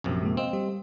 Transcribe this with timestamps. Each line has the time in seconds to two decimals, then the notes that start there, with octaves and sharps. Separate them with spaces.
0.04 A#1 F#2 C3
0.22 G#3 A#3
0.37 C4 D#5 F5
0.53 G3 G4 D#5